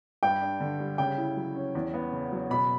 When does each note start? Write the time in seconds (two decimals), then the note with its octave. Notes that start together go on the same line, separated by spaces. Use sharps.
0.23 G2 G5
0.41 D4
0.60 D3
0.80 G3
0.98 C#3 G5
1.18 E4
1.36 F#3
1.55 C#4
1.75 E2
1.94 B3
2.12 C#3
2.32 F#3
2.50 B2 B5